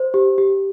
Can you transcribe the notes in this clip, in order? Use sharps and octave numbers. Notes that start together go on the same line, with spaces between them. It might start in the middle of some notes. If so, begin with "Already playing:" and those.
Already playing: C5
G4
G4